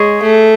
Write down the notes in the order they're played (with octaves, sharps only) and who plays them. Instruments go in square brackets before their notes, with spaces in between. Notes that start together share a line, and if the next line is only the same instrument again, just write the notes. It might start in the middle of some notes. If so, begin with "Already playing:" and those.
Already playing: [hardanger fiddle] G#3 [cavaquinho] G#4 C#5
[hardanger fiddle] A3